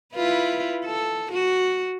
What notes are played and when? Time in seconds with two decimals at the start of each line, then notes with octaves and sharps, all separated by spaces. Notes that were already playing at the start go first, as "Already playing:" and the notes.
0.14 E4 F4 B4
0.85 A4
1.32 F#4